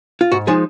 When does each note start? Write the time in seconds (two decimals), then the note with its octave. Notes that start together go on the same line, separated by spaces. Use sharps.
0.21 F4
0.32 G#2 F#4
0.47 F3 G#3 D#4 G#4